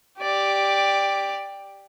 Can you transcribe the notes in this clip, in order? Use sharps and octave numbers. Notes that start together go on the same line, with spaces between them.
G4 D5